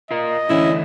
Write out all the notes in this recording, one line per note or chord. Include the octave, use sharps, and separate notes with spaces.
F4 A#4 D#5
D3 E3 A3 C#4 E4